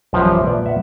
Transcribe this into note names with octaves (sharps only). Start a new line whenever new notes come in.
A#1 F#2 E3 F3 G3 B4
E5 D6
A#2 B4 D5
E5 F#5